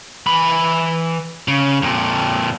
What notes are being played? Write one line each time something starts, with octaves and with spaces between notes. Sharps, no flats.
E3 B5
C#3
F2 A#2